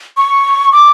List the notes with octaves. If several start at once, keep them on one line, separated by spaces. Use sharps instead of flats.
C#6
D6